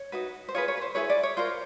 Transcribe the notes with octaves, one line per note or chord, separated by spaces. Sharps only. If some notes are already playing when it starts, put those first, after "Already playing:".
Already playing: C#5
D#4 F#4 B4
C5
F4 G#4 B4 C#5
C#5
B4
C5
E4 G#4 B4 C#5
D5
C#5
F4 A#4 C5